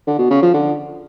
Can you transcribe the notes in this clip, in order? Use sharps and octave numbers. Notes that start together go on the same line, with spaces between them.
D3
B2
C#3
F3
D3